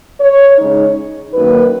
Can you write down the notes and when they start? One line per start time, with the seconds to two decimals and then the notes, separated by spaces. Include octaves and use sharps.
0.21 C#5
0.59 C#3 G#3 D#4
1.34 F#2 D#3 A#3 D#4 B4